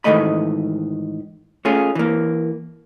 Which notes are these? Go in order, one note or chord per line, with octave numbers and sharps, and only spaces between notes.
G#2 D#3 E3 A3 D#5 B5
A3 C#4 F4 G#4
E3 A#3